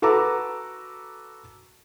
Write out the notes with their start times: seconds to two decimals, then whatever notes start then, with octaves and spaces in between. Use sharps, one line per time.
0.02 F#4 A4 B4 A#5 D6 E6